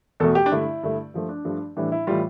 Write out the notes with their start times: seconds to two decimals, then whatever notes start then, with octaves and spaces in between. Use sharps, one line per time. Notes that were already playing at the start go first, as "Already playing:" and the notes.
0.20 E2 B2 A3 A4
0.35 G4
0.46 D4
0.51 G2 D3 A3 E4
0.83 G2 D3 A3
1.14 G2 F3 A3
1.29 D4
1.45 G2 F3 A3
1.76 A2 E3 G3 D4
1.92 E4
2.07 A2 E3 G3 F4